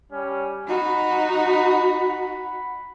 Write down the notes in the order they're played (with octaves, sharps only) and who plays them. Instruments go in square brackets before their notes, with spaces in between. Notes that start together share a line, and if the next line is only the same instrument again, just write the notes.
[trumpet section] G3 C#4
[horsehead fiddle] D#4 F#4 [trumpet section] F#5 B5